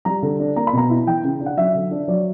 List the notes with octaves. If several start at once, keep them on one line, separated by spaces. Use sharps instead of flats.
G3 A#5
D3
D4
A#3 A#5
B5
B2 A#5
E4
E3 G5
C#3
D4
F#5
F#3 E5
D3
D4
F#3 D5